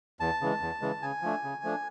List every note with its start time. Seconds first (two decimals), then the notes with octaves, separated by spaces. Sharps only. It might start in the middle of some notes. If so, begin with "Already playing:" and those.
0.20 E2 A5
0.41 C#3 E3 G#3
0.61 E2
0.81 C#3 E3 G#3
1.02 C#3 G#5
1.22 F3 A3 D4
1.44 C#3
1.64 F3 A3 D4